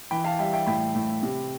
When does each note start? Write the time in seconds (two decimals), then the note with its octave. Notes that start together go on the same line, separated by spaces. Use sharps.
0.11 E3 G5 B5
0.24 F5 A5
0.39 G3 E5 G5
0.53 E5 G5
0.66 A2 G5 B5
0.95 A2
1.23 C3